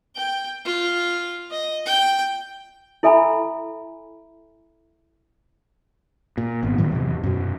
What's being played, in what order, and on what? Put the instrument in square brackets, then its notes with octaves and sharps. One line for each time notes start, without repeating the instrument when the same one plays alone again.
[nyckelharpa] G5
F4
D#5
G5
[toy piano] E4 A4 E5 G#5 A#5 B5
[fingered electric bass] A#2
G#1 B3
A2 D#3 F#3 G3
E2 C3
F#2 B2